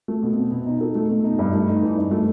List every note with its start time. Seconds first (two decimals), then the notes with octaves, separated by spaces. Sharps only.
0.08 A3
0.23 B2
0.37 C4
0.51 B2
0.66 D#4
0.81 A4
0.95 A3
1.10 B2
1.24 D#4
1.39 G2
1.53 A3
1.68 D#4
1.82 E3
1.97 G2
2.11 A3